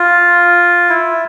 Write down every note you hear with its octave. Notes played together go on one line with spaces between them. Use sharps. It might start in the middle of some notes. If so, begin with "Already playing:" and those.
Already playing: F4
E4